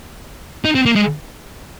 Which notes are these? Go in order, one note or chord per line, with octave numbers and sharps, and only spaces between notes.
D#4
C4
A#3
G#3